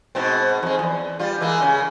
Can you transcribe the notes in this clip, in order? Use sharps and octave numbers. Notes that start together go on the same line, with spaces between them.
G#2 B2 C4
F2 G#3
E2
G3 F4
E3 G#3 A#3
C#3